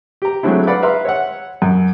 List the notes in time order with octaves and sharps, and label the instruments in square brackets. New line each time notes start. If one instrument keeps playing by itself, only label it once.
[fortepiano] G4 A#5
F#3 G#3 A3 C4 D4 E4
B4 D5 F5 F#5 B5
B4 E5 F5 A#5 C6
C#5 E5 F#5
F#2